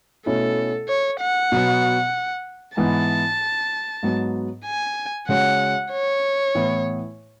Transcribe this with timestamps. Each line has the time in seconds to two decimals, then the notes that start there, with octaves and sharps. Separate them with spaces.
0.26 B2 A3 C#4 E4 A4
0.88 C#5
1.21 F#5
1.52 B2 F#3 B3
2.77 G#2 E3 B3 A5
4.03 G#2 F#3 B3
4.65 G#5
5.28 C#3 G#3 C#4 F#4 C#5 F#5
5.91 C#5
6.55 A2 E3 B3 E4 B4